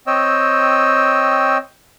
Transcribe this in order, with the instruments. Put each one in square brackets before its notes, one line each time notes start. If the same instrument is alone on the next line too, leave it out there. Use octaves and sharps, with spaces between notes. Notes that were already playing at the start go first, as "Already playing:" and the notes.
[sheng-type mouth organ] C4 C#5 D#5 G5 E6